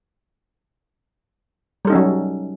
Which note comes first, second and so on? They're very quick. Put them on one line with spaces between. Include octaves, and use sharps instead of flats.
G3 A4 D#4 C#4 F#3